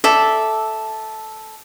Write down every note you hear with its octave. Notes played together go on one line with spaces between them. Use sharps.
A4 D5 E5